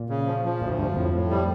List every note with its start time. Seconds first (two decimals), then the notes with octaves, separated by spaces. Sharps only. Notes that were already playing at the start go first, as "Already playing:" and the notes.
Already playing: A#2
0.09 C#3
0.26 F3
0.45 F3
0.62 D2 A#2
0.70 A2
0.79 G2 F3
0.96 F2 A2
1.13 A2
1.31 G3